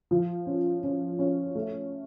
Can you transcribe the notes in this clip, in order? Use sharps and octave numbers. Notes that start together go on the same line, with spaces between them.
F3
C#4
C#4
C#4
A3